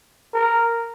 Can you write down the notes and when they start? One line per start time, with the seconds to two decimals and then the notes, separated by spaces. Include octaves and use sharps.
0.34 A#4